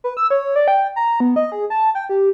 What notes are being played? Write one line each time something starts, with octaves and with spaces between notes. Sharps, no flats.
B4
E6
C#5
D5
G5
A#5
B3
D#5
G#4
A5
G5
G4